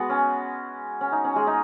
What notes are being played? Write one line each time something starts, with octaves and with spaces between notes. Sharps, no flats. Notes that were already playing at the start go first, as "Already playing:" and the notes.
Already playing: G#3 B3 F#4
C#4
C#4
D#4
C#4
G#3 G#4
D#4 D#5